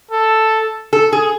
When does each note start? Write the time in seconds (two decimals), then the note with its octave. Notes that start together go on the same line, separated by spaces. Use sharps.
0.11 A4
0.93 A4
1.12 G#4